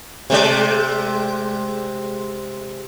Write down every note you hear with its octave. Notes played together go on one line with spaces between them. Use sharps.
C3 G#3 D5